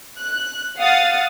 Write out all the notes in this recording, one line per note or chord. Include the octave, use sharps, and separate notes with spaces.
F#6
F5 F#5 D#6 A6